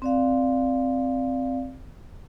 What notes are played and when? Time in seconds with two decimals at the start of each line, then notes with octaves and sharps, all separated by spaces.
0.02 C4 D5 F5